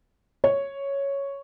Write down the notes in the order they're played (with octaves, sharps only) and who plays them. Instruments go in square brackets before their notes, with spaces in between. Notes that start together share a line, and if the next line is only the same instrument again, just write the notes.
[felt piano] C#5